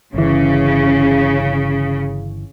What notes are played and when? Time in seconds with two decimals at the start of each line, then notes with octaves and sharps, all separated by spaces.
0.14 G1 C#3 E3